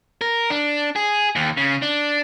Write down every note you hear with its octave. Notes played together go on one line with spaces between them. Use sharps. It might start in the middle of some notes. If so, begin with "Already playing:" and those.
A#4
D4
G#4
D#2
C#3
D4